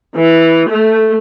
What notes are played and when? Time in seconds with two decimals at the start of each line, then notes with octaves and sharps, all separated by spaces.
0.16 E3
0.70 A3